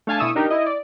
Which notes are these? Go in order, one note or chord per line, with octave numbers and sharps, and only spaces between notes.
A3 D4 F5 G#5 A5
B2 E4 C#6 D#6 E6
D4 D#4 G4 A#4
E4 D#5
D5